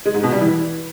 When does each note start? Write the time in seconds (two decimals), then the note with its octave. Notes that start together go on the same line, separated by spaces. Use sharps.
0.05 G#3
0.14 G#2
0.23 B2
0.32 G3
0.41 E3